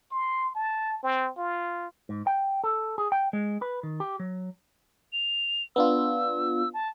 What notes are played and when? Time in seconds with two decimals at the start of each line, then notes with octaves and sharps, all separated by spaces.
0.11 C6
0.55 A5
1.03 C4
1.37 F4
2.09 G#2
2.27 G5
2.64 A4
2.98 G#4
3.12 G5
3.33 G#3
3.62 B4
3.83 D#3
4.00 G4
4.20 F#3
5.13 F7
5.76 B3 D4 F4 E6
6.74 A5